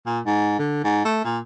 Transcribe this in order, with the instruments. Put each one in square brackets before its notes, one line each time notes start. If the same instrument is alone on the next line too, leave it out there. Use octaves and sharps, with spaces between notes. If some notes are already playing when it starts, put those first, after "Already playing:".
[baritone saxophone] A#2
G#2
D3
G#2
A3
A#2